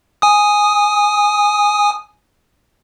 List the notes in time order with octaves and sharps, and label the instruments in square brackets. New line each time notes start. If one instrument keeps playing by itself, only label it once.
[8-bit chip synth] G#5 D#6